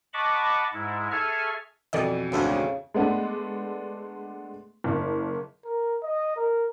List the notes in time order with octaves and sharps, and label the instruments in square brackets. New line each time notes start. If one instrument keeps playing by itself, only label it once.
[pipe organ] D#5 F#5 A5 B5 C#6 D6
G#2 G#3 E4
G#4 A4 E5 G#5 C#6 F6
[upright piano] F2 B2 E3 [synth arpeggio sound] A4 D5 D#5
[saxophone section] D2 G#2 D4 [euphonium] C#3
[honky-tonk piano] G#3 A3 B3 D4
F#1
[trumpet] A#4
D#5
A#4